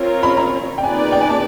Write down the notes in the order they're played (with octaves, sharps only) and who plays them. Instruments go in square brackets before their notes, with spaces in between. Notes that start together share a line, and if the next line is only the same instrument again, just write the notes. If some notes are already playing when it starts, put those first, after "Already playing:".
Already playing: [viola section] C4 F4 A#4 C#5
[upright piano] B5
A#5
G5
[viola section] A#3 D#4 G#4 B4 D5 [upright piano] G#5
[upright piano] G5
G#5
A5